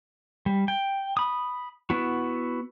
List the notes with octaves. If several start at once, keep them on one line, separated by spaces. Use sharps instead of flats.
G3
G5
B5 D#6
B3 E4 F#4